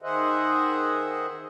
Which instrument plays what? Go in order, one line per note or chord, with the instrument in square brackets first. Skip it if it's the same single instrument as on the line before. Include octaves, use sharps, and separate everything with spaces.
[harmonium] D#3 G#4 C5 D#5 E5 F#5